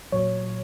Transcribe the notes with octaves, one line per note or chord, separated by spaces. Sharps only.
A#2 F#3 C#5